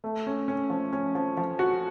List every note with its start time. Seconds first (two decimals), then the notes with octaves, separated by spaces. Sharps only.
0.04 A3
0.27 C#4
0.48 C#4
0.70 F3
0.93 C#4
1.15 F3
1.37 F3
1.59 F#4